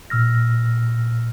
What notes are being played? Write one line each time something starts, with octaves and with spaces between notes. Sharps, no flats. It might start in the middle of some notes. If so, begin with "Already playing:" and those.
A#2 E6 F6 A#6